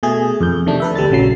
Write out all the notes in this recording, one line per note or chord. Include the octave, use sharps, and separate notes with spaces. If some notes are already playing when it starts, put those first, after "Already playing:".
B2 A3 G#4
F2 G6
C3 D#3 A3 D4
A4 B4 E5
D2 G3 A4 A6
A#1 C#3 F#3 C7